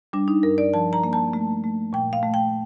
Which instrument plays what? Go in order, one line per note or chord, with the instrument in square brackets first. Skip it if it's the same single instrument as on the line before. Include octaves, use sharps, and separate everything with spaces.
[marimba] G3 D4
D#4
G2 A#4
D5
F3 A5
A#5
A#3
A5
A3
A3
A#2 G5
F5
A3
G5